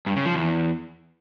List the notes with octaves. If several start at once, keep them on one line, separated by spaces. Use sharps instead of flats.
G2
C#3
F3
E2